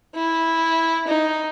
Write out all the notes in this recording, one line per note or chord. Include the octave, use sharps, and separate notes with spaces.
E4
D#4